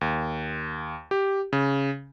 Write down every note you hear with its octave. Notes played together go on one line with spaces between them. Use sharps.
D#2
G4
C#3